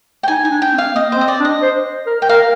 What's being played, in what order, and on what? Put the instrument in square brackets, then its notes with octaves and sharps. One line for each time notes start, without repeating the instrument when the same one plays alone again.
[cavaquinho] G5
[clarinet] D#4 [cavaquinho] G#5
[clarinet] D#4 [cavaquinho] G#5
[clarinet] D4
[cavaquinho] G5
[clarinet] C4
[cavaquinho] F5
[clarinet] A#3 [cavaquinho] D#5
[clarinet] C4 [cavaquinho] C5
[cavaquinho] D#5
D5
[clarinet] D4
[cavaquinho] D#5
[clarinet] C5
A#4
[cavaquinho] G5
[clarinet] A#4 [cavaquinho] F5